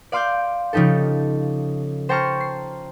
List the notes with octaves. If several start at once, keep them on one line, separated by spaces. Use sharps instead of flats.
D5 F5 C6 D6 F6 G6
C#3 F3 D#4 G4 A4
C5 G5 A5 A#5 C#6 F6
C7